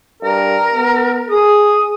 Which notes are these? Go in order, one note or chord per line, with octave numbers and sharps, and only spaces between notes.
G2 A#4
B3
G#4 D#6